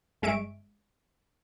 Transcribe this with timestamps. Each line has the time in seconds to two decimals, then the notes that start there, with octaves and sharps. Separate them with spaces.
0.22 G1 G#3 E5 C#6 D7